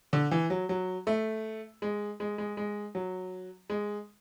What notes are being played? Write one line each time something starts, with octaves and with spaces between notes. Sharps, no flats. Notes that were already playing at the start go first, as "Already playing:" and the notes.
D3
E3
F#3
F#3
A3
G#3
G#3
G#3
G#3
F#3
G#3